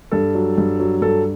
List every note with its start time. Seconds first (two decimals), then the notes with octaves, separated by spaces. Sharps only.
0.11 G2 A4
0.35 F#3
0.58 G2
0.80 F#3
1.02 G2 A4